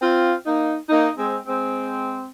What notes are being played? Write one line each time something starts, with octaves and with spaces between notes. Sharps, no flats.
C4 F4
A#3 D#4
A#3 D#4
G#3 C4
G#3 C4